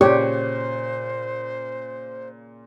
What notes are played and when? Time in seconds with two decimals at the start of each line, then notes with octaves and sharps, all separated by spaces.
0.01 A#2 C#3 G4 C5 C#5